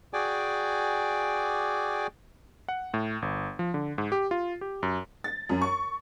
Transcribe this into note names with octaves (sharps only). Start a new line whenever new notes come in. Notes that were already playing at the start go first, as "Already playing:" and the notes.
F#4 G#4 D5 G5 G#5 D6
F#5
A2
G1
F3
D3
G#2
G4
F4
G4
F#2
A6
F#2
C#6